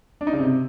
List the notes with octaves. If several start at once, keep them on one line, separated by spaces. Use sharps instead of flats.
D4
D#4
C#3
C3